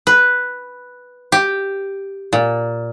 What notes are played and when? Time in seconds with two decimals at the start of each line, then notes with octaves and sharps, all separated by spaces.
0.07 B4
1.32 G4
2.33 A#2